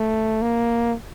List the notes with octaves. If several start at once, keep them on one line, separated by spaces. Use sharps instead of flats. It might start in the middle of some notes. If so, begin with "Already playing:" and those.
Already playing: A3
A#3